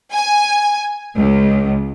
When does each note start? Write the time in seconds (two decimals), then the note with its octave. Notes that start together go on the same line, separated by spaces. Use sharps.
0.12 G#5
1.15 C#2